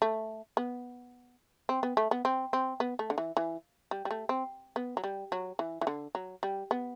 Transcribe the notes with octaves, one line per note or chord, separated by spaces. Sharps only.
A3
B3
C4
B3
A3
B3
C4
C4
B3
A3
D3
E3
E3
G3
G3
A3
C4
B3
F#3
G3
F#3
E3
E3
D3
F#3
G3
B3